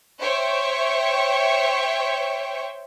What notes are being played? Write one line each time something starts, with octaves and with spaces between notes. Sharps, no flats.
C5 C#5 E5 G5 C#6